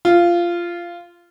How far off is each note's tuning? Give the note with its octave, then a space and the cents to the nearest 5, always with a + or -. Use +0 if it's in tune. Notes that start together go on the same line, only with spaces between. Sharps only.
F4 -15